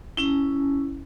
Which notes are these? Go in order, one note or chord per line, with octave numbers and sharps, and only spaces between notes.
C#4 E4